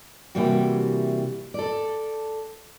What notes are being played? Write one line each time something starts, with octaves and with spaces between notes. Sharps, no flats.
C3 E3 G3 A#3 F#4
A4 D5